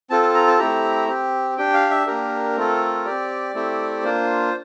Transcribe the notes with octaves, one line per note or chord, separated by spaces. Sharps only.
C4 F4 A4 A5
A5
A#5
A5
A3 C4 E4 G4 A#5
C4 G4
D4 G4 G5
F5
E5
A#3 D4 G4 A#4
A3 C4 F4 A4
C4 G4 D5
A3 C4 E4 G4
A#3 D4 F4 C5